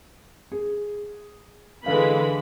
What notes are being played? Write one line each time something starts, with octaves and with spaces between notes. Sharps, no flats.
G#4
D3 E3 G#3 F5 B5